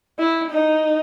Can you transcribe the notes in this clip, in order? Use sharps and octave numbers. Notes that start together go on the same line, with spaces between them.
E4
D#4